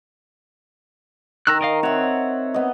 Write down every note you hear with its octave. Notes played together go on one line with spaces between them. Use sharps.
D#3 A#5 E6 F#6
A#4 D#5 F5
C4 C#5 E5 F#5
B3 D#5